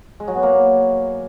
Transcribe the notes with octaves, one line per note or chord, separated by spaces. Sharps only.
G#3
F#3
B3
A#3